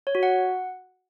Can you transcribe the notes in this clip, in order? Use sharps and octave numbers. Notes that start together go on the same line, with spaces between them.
C#5
F#4
F#5